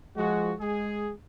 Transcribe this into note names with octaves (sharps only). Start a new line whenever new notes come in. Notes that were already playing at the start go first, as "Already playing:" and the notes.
F3 G#3 F#4
G#3 G#4